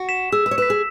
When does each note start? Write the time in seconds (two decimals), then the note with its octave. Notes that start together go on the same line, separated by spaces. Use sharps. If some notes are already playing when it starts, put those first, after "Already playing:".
Already playing: F#4
0.09 B6 E7
0.32 G#4 E6
0.46 B4
0.51 C#5
0.58 B4 B6 E7
0.70 G#4